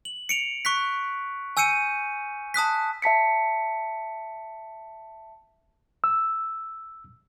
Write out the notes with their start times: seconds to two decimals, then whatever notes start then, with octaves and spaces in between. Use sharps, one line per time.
0.05 F#7
0.29 C#7 D7 F7
0.65 C#6 F#6 B6
1.57 G#5 E6 G6 C#7 D#7
2.54 A5 D#6 F#6 B6
3.02 E5 A5 B6 C#7
6.04 E6